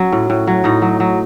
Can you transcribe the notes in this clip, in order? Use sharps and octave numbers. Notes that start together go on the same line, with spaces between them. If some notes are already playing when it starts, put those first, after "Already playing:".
Already playing: F#3 C#4
A2
A2
F#3
A2 D#4
F#3
F#3